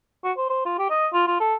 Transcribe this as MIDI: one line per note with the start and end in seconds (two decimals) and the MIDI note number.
0.24 0.32 66
0.37 0.46 72
0.50 0.62 72
0.65 0.75 65
0.79 0.87 67
0.90 1.07 75
1.13 1.22 65
1.27 1.39 65
1.40 1.55 69